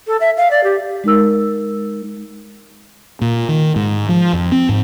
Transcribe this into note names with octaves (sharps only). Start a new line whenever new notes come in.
A4
E5
F5
D5
G4
G#3 D#4 A#4 E6
A#2
D#3
G#2
F3
F2
C4
G#2